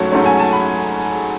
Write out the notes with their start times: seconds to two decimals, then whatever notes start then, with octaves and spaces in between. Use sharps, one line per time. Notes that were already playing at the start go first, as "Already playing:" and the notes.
Already playing: G#2 F#3 A3 C#4 C#5 A5
0.12 G#2 F#3 A3 C#4
0.26 G#5
0.40 A5
0.53 B5